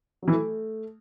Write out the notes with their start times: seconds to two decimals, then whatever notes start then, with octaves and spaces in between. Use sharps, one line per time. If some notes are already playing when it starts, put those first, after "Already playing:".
0.22 F#3
0.28 E3
0.33 A3